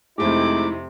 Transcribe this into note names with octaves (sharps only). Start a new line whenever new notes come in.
F2 C3 G#3 A3 C4 D#4 E4 D6